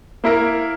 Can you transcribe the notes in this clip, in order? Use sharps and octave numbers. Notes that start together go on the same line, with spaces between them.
A#3 E4 A#4